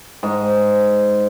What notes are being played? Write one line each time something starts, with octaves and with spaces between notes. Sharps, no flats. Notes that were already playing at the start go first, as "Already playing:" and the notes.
G#2